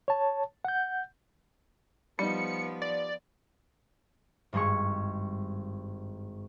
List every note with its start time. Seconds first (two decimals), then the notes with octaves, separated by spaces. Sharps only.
0.08 C#5 A5
0.65 F#5 G6
2.19 F3 G3 B3 D#4 C#7
2.82 D5
4.53 G#1 G2 G#3 G#4 C#6